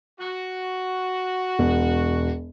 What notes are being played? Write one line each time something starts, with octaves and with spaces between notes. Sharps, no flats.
F#4
E1